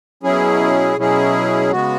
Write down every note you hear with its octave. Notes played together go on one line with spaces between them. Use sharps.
B2 F#3 C#4 E4 G#4
B2 F#3 C#4 E4 G#4
C#3 G#3 B3 F#4